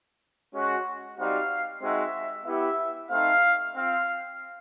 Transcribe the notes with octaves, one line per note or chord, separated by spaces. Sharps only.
G#3 C#4 F#4
G3 C4 D#4 F#4 F5
G#3 C4 D#4 F#4 E5
B3 E4 G4 E5
A3 C4 D#4 F5
C4 F4 F5